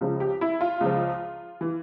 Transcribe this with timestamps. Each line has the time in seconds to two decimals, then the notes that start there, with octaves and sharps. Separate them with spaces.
0.01 C#2 C#3 F3
0.20 G4
0.41 E4
0.61 F4
0.81 C#2 C#3 F3
1.61 E3